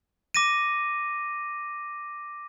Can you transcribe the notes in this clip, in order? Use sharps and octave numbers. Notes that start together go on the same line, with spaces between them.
D6 A#6 D#7